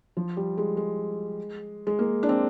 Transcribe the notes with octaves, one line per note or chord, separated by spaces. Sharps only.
F3
G3
G#3
G#3
G#3
A#3
D4
C4